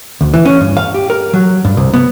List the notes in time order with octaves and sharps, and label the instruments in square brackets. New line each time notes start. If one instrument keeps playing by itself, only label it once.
[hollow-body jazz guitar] D2
E3
C#4
G2
F5
G4
A#4
F#3
G2
C2
B3